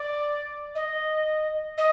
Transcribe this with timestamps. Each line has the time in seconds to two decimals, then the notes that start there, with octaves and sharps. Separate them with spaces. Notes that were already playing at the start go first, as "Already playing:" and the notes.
Already playing: D5
0.75 D#5
1.77 D#5